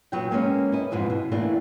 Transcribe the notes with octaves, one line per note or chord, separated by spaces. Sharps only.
A#2 F#3 B3 C#5 G5
G#3 A#3 B3 C#4
E4 D#5
F2 G#2 B2 E3 F3
B2
A2 E3 A3 A#3 D4